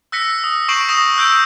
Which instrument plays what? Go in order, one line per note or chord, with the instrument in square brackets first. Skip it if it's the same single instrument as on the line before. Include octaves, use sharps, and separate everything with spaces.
[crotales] E6 F#6 A#6 B6 C#7
D#6
C#6 G6 C7 D7 E7 F#7
D#6 A#6 E7
E6 F#6 G6 D7